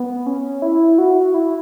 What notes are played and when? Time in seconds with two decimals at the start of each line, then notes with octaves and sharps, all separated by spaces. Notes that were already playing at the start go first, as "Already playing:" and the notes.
Already playing: B3
0.26 C#4
0.62 E4
0.98 F#4
1.34 E4